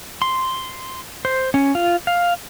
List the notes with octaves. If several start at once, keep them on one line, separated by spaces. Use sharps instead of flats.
C6
C5
C#4
F4
F5